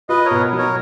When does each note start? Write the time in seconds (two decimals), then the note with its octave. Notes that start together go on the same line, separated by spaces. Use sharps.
0.09 F4 B4 D#5
0.25 A#4 C#5
0.31 B2
0.53 F#3
0.58 A#4 C#5